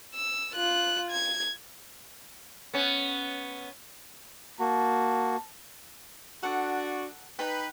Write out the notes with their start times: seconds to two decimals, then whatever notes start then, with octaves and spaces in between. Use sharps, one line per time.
0.14 E6
0.54 F4 F#6
1.10 G#6
2.74 B3 C#4
4.60 A#3 F#4 A5
6.43 D4 F#4 A4 F#5
7.39 D#4 B4 G5